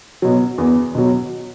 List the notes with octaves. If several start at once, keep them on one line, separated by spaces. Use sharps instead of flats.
B2 F#3
E2
B2 F#3